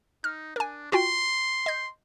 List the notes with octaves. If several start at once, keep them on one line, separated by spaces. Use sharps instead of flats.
D#4 F6
D4 A#4 G#5
F4 F#4 G5 C6
D#5 G6